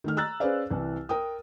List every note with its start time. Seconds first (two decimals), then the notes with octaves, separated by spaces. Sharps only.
0.04 D#3 A3 F6
0.17 A#5 E6 F#6 A6
0.40 C#4 G#4 B4 C5 D5 F5
0.70 C2 E3
1.09 A#4 G5 D#6